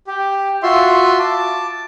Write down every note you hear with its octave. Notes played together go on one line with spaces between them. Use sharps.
G4
F4 F#4 E5 C6
A5 D6